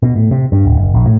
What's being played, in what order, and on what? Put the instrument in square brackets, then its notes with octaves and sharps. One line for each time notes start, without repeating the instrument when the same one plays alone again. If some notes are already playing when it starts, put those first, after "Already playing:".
[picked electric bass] B2
A2
C3
G2
D1
F#1
A#1
A2